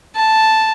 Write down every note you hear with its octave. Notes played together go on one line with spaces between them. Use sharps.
A5